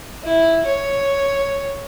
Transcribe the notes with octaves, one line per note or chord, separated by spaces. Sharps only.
E4
C#5